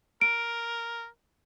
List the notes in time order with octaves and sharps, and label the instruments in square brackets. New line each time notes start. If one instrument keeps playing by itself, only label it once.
[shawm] A#4 [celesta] D7